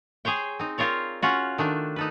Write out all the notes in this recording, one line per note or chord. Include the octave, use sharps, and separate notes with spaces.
G#4 C5 C#5 G5
C4 D#4
C4 F4 A#4 C#5 D5
C#4 F4 F#4
D#3 A3 D4
D#4 A4 B4